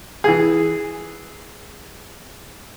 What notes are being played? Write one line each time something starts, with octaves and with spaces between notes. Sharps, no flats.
E3 G#4